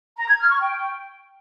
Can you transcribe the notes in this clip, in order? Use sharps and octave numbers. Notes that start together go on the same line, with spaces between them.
A#5
G#6
F6
C#6
G5